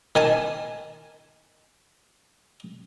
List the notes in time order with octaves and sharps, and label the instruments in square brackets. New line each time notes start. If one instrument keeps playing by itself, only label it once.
[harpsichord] D#3 G#5 A5